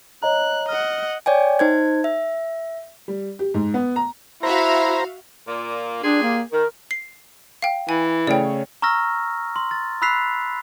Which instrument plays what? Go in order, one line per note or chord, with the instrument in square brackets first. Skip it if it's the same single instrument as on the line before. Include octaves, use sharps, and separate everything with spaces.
[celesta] C#5 D#5 A#5 [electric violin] F#6
[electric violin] D#5 F#5 [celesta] F6
[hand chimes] C#5 D5 G5 G#5
D#4 C5 G#6
E5
[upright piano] G3
G4
G#2
B3
A#5
[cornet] E4 [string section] F#4 E5 F5 [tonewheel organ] C5 A#5
[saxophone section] A#2 A#3
[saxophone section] A#2 G4 G#4 [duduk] D4
[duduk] A#3
[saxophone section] D#3 [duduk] A#4
[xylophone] C7
F5 G5
[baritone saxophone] E3 [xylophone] G#5
[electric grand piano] C#3 A3 C#5 [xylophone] D5 G5
[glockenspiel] A#5 C#6 E6 F6 A#6
C6
A6
B5 E6 F#6 B6 C7 F7